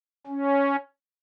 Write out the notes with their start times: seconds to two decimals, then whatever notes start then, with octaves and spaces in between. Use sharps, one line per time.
0.27 C#4